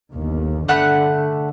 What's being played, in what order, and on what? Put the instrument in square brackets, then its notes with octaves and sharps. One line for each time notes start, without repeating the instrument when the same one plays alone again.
[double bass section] G1 D#2
[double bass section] D3 [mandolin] A3 F#5 B5